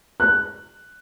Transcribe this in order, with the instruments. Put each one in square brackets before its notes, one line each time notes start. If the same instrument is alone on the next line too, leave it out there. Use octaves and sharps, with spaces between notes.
[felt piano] F#6